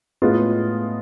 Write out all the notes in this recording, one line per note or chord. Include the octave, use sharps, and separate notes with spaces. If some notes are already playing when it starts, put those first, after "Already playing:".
A2 G#3 B3 F4